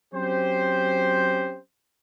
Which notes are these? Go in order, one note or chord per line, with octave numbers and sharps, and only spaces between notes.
F#3 C4 C#4 G4 C5